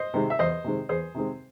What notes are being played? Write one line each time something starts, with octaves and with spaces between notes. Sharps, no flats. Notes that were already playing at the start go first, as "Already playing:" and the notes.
Already playing: C5 D#5
C3 D#3 G#3 C4
E5
E2 C5 D#5
C3 D#3 G#3 C4
E2 G#4 C5
C3 D#3 G#3 C4